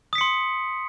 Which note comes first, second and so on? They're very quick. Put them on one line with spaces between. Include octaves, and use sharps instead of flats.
D#6 B6 C#7 C6